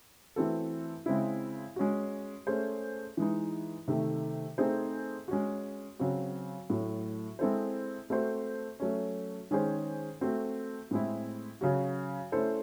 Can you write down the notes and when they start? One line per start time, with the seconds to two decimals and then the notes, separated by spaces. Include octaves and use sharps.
0.36 E3 A3 C4 F#4 A4
1.06 C#3 G#3 C4 E4
1.76 G#3 C#4 F#4
2.47 A3 C#4 G#4 C5
3.17 E3 G#3 D#4
3.88 C3 D#3 A3
4.58 A3 C4 D#4 G#4 C5
5.28 G#3 C#4 F#4
5.99 C#3 F#3 C4 F#4
6.70 A2 F#3 A3
7.39 G#3 C4 E4 A4 C5
8.10 A3 C4 F#4 C5
8.80 F#3 A3 C#4
9.51 D#3 G#3 C#4 G#4 C5
10.21 A3 C4 F#4
10.91 A2 G#3 C4 E4
11.61 C#3 F#3 C#4 F#4
12.32 A3 C#4 E4 A4 C5